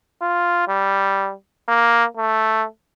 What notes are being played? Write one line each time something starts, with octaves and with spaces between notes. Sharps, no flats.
F4
G3
A#3
A3